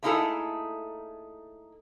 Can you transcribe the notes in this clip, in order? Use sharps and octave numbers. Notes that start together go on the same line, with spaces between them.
A3 A#3 D#4 E4 G#4 A4